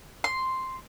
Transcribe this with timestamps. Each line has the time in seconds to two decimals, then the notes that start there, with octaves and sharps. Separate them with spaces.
0.24 C6